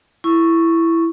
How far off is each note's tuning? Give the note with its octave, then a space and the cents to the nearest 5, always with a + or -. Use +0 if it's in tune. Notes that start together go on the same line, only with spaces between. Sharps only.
E4 +10 C#6 +0